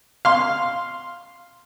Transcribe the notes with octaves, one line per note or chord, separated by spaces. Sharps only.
F5 C6